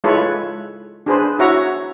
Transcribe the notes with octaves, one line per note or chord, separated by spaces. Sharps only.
G#3 E4 F4 A4 B4 C#5
D4 G#4 B4 C5
E4 F#4 C#5 E5 F#5 A#5